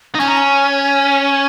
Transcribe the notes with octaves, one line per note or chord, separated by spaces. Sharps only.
D#4
C#4 G#5
A#5
G#5